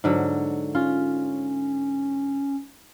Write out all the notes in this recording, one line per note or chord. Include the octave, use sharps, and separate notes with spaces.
G#2 D3 F#3
C#4 F4